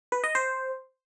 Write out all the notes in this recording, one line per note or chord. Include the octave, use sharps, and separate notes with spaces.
B4
D#5
C5